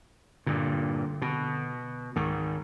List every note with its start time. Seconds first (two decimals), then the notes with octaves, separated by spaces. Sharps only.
0.46 G2 A#2 D3
1.22 B2
2.16 C#2 G#2 D#3